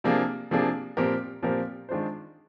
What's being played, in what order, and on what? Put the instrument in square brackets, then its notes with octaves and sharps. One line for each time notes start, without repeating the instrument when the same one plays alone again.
[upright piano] C3 F3 A#3 D4 G#4
C3 F3 A#3 D4 G#4
A#2 F3 C4 G4 A#4
A#2 F3 C4 G4 A#4
D#3 G#3 D4 F4 C5